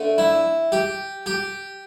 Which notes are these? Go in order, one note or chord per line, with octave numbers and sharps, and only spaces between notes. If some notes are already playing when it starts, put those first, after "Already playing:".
Already playing: D3 A3
E4
G4
G4